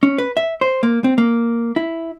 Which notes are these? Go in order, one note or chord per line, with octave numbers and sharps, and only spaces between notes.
C#4
B4
E5
C5
A#3
C4
A#3
E4